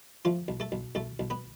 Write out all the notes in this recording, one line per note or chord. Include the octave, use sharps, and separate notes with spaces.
F3 A3 F4
B1
A3 A4
B1
B1 A3 A4
B1
B3 B4